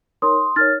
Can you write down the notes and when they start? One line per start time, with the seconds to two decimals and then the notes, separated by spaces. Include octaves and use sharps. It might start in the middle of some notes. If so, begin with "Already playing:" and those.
0.22 D#4 A#4 C#5 C6 D#6
0.56 D#4 A#4 C#5 F6 A6